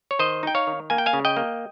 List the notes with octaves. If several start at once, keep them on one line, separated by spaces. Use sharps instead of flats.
C#5
D#3 C5 D#5
D#4 G5
C#5 F5
D#3
A#3 G#5
G5
F5 G#5
C#3
D#5 G5
A#3